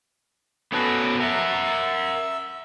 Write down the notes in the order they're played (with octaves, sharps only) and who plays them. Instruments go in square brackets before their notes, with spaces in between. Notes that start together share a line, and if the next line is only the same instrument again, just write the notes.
[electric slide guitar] B3 C#4 F#4 [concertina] A4 B4
[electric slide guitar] A#4 F#5 [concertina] E5